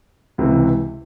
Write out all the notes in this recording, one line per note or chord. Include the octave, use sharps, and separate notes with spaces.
C#2 C3 E3